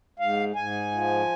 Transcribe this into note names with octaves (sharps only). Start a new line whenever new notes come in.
G#2 F5
G#2 G#5
F3